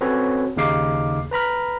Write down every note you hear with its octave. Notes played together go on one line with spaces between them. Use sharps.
C4 C#4 F#4 A4 B4 C#5
D#2 C#3 D#4 F5 D6 C7
B4 A#5 B5 F6